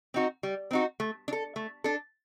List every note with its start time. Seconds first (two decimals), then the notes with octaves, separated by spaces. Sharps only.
0.14 C4 D#4 F#4
0.43 G3
0.71 C4 D#4 F#4
1.00 A3
1.28 D4
1.33 A4
1.56 A3
1.84 D4 A4